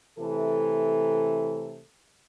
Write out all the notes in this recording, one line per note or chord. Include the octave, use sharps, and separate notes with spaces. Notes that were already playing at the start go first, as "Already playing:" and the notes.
C3 E3 A3 A4